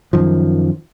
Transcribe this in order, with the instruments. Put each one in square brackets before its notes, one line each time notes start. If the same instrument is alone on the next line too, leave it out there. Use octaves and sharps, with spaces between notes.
[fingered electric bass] F#2 D#3 F3